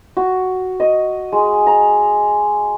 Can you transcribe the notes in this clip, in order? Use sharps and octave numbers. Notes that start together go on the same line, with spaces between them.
F#4
D#5
G#3
A#5